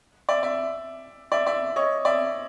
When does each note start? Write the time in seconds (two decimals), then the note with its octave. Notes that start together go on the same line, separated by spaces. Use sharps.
0.29 D5 E5
0.43 D5 E5
1.32 D5 E5
1.47 D5 E5
1.76 C#5 D#5
2.05 D5 E5